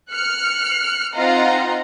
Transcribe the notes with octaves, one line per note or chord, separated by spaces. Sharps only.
F6 F#6 C#7
C4 D#4 F4 D#5 F#5 A#5